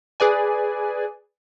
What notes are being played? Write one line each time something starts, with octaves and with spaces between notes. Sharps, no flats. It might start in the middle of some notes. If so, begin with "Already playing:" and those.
G#4 B4 D5 G#5